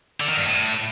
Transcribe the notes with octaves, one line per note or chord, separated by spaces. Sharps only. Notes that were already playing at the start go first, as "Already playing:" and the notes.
D3
D#3
G2
A2